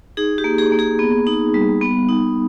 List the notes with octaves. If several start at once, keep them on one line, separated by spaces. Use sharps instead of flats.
D#4 G#4
G4
A#3
G#4
A#3
G#4
B3
D#4
G3
B3
D#4